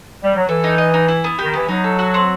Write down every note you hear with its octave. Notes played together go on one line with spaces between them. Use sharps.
G3
F#3
E3 A4
D#4
D#5
D#4
E4
B3
D#3 G4
E3 B3
F#3 D#4
A4
F#4
C4